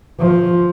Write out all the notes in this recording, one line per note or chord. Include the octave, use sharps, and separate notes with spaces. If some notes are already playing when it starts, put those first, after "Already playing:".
F3